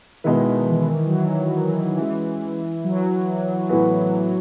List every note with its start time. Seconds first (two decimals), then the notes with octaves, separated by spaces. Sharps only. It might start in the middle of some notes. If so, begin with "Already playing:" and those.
0.24 B2 D#3 G#3 B3 E4 B4
0.67 E3
1.07 F#3
1.11 E3
1.40 F#3
1.68 E3
1.97 E3 G#3 C#4 F#4
2.84 F#3
3.69 A2 E3 B3 F#4